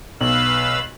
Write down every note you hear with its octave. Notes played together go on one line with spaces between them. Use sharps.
B1 B4 F5 E6 F#7